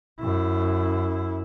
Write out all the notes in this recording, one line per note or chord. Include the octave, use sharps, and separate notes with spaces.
F#2 E4